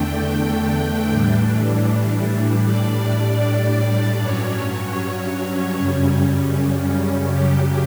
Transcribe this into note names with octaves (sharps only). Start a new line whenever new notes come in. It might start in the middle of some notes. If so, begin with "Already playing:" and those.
Already playing: E2 D3 A3 D4 G5
A2 E3 G3 D4
A2 G3 D4 D5
G2 F#3 C#4 C#5
F#2 C#3 G3 C#4
F#2 C#3 F#3 G4